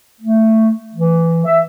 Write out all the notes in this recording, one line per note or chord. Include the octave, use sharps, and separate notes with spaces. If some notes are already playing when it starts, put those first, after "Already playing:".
A3
E3
E5